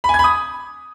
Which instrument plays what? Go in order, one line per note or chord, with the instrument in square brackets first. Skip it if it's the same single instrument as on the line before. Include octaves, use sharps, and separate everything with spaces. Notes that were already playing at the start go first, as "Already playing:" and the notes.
[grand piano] B5
G#5
G#6
B5
D#6